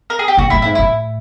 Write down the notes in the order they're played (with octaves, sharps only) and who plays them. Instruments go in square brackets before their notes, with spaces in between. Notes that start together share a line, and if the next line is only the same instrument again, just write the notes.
[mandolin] A#4
G#4
G4
[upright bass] A#2 [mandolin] F#4
[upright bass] A2 [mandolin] E4
[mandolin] E4
[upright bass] G#2
[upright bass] A2 [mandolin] E4